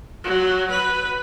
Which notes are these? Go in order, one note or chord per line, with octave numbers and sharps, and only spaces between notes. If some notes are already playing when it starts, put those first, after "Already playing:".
F#3
B4